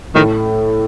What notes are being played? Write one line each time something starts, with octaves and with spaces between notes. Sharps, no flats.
A2 D#3 A3